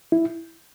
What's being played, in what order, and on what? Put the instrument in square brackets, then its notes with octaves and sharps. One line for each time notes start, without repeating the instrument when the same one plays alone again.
[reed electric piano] E4